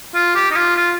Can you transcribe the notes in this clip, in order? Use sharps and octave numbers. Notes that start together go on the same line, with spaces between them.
F4
G4
D#4
F4
F4